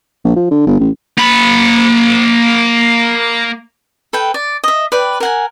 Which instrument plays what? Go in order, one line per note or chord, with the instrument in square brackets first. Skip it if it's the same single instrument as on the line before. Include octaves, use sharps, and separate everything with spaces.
[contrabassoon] A#1
F3
D3
G1
A1
[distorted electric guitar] A#3 B5
[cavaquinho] A4 B4 G5
D5
D#5 E5
B4 D5 G5
A#4 F#5 G#5